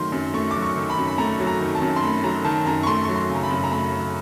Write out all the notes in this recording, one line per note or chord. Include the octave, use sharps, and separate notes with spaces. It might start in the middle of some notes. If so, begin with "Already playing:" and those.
Already playing: D#3 F#3 A3 C6
F#2
A3 C#6
F#3 D6
C#6
D#3
B5
F#2
B5
A3 A#5
F#3
A#5
D#3
A5
F#2
C6
A3 B5
F#3 A#5
D#3 A5
F#2 A#5
C#6
A3 C6
F#3 C#6
C6
C#3
A#5
B5
F#2
A#5
A3 B5
F#3